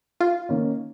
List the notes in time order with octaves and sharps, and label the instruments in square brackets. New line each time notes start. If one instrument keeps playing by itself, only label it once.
[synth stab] F4
[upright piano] D#3 A#3 C#4